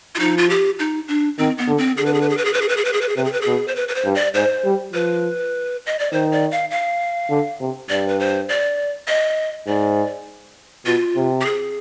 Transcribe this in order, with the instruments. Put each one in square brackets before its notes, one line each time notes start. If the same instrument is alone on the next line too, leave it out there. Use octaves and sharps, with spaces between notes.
[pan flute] F4
[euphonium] F3 [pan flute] D#4
[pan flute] F4
G4
D#4
D4
[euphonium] D#3 [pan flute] C4
[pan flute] B3
[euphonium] D3
[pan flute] C4
[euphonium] D3 [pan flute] G#4
[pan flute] B4
G#4
B4
G#4
B4
G#4
B4
G#4
B4
G#4
B4
G#4
B4
G#4
[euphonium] C3 [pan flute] B4
[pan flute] G#4
B4
[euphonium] B2 [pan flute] G#4
[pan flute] C5
B4
B4
C5
[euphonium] G2
[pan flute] D5
[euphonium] G#2 [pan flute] C5
[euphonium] G3
[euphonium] F3 [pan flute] B4
[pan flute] D#5
D5
[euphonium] D#3 [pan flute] C5
[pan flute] D5
F5
F5
[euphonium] D3
C3
[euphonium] G2 [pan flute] D5
[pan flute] B4
C5
D5
D#5
[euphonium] G#2 [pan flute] D5
[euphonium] B2 [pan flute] F4
[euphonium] C3
[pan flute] G4
G#4